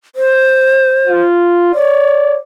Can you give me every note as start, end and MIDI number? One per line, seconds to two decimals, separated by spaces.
0.16 1.21 72
1.07 1.74 65
1.74 2.35 73
1.74 2.37 74